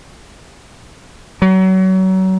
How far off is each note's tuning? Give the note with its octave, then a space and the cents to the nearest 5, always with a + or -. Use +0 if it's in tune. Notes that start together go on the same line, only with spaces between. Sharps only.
F#3 +30